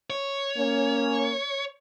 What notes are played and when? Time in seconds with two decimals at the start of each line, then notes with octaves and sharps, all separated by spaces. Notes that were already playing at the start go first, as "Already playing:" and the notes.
0.10 C#5
0.57 A#3 C#4